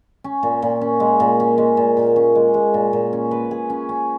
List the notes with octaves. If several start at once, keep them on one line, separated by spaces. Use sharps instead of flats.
C#4
A#2
A#2
C#4
G#3
A#2
C#4
G#3
A#2
A#2
C#4
G#3
G#3
A#2
A#2
C#4
B4
G#4
C#4
C#4